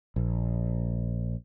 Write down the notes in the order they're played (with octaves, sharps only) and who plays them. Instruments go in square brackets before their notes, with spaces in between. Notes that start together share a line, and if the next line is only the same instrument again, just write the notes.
[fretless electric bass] A#1